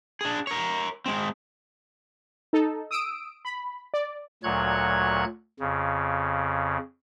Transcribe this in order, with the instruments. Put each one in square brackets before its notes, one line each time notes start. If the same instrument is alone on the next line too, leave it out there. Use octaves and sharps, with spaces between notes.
[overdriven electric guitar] D4 G#4
A#4 C#5
G#3 C4
[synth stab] D#4 A4
D#6 E6 D7
B5
D5
[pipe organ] D2 A#2 F#3 C#5 F#6 G#6
F2 C#3